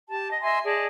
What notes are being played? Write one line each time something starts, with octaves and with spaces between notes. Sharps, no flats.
G4 A5
D#5
D#5 E5 G#5 C6
G#4 D5 D#5 A5